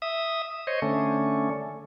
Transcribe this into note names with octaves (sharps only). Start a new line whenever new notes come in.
E5 D#6
C5 C#5 D#5
D3 A3 C#4